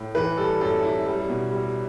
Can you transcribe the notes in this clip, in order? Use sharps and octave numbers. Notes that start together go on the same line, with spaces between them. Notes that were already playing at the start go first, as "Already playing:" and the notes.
Already playing: A2
E3 B4
G3 A4
F#2 A4
F#2 E4
G3
B2
G3